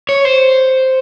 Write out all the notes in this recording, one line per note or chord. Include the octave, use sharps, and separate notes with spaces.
C#5
C5